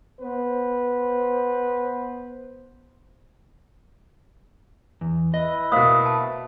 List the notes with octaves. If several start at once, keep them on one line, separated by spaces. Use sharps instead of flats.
B3 B4 C5
E2
E4 B4 D#5 E5
B2 A#3 C5 F5 D#6
A5